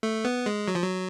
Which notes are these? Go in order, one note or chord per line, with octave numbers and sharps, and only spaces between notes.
A3
B3
G#3
F#3
F3
F#3